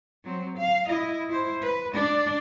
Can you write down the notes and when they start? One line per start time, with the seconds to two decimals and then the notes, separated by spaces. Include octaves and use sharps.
0.25 F#3 C4
0.58 F5
0.88 E4 D#5
1.29 E4 C5
1.63 B4
1.94 D4 D5